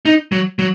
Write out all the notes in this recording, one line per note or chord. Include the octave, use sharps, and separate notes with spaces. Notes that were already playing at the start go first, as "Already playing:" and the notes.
D#4
F#3
F#3